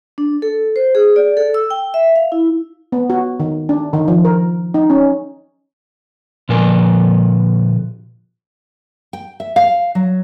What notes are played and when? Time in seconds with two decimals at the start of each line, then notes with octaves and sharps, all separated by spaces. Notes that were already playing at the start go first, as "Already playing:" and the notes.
0.18 D4
0.42 A4
0.76 C5
0.95 G#4
1.16 D5
1.37 A4
1.54 E6
1.71 G5
1.94 E5
2.16 F5
2.32 E4
2.92 B3
3.10 F#4
3.40 D#3
3.69 D4
3.93 D#3
4.08 F3
4.25 A#4
4.74 D#4
4.90 C#4
6.49 A#2 D3 F3 A#4 B4 G#5
9.13 G5
9.40 E5
9.56 F5
9.95 F#3